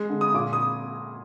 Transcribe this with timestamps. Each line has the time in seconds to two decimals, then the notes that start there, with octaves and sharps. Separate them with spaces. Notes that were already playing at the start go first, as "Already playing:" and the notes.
Already playing: G#3
0.10 D3
0.21 D#6
0.34 A#2 D6
0.53 D#6